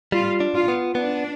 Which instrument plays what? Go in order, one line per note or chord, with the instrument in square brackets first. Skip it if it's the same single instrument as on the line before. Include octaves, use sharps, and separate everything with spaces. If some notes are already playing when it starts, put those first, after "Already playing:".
[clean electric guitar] G3 [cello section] F4
[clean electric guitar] D4
[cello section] F4
[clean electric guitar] B3
[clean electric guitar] B3 [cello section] D4